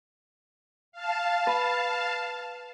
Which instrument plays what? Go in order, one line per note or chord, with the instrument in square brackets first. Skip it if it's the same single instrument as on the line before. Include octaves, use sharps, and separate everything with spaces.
[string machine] F5 A5
[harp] B4